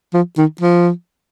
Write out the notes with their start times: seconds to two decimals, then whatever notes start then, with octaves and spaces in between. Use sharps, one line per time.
0.14 F3
0.38 D#3
0.61 F3